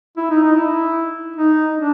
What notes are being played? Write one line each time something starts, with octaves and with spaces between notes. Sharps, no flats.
E4
D#4
D#4
E4
D#4
D4